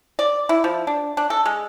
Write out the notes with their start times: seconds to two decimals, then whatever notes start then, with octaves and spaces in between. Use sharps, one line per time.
0.19 D5
0.49 E4
0.64 F3
0.87 D4
1.17 D4
1.30 A4
1.46 G#3